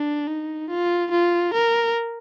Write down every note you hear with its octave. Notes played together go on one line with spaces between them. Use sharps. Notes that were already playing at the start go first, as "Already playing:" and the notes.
Already playing: D4
D#4
F4
F4
A#4